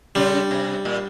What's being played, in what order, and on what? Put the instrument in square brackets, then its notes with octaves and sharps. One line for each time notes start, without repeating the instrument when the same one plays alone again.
[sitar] C#3 [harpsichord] G3
[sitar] C3
A#2